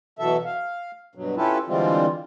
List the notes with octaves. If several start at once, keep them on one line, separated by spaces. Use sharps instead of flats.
B2 E3 F#3 A4 E5
F5
G2 B2 F#3
C#4 E4 F4 G4 A4 B4
D3 E3 G3 G#3 C4 F4